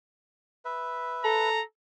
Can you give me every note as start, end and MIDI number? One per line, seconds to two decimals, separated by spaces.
0.65 1.49 71
0.65 1.49 76
1.24 1.60 69
1.24 1.63 82